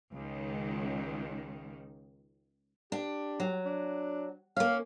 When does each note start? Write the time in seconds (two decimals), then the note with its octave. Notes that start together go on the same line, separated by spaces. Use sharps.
0.13 C#2 D#3
2.92 D4 G4
3.40 F#3
3.65 D4
4.57 A#3 C#4 F5